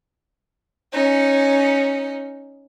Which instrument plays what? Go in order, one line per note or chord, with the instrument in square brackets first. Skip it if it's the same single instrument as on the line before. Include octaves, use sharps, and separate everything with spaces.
[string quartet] C#4 D#4